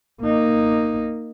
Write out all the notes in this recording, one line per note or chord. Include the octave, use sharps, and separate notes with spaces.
A#3 D#4